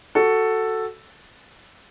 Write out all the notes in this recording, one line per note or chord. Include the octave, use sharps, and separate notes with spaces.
F#4 A4